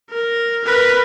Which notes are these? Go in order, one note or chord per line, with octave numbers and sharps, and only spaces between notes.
A#4
A#4 B4